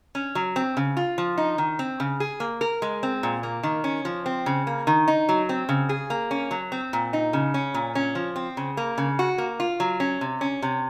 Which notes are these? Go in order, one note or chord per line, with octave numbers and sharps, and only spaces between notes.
C#4
F#3
C4
C#3
F4
F3
D#4
D#3
C4
C#3
G#4
A#3
A#4
G#3
C4
A#2
A#3
D#3
C#4
F3
C4
C#3
A#3
D#3
D#4
F#3
C4
C#3
G#4
A#3
C#4
F#3
C4
A#2
D#4
C#3
C#4
A#2
C#4
F3
C4
C#3
A#3
C#3
F#4
A#3
F4
F#3
C#4
C3
C#4
C3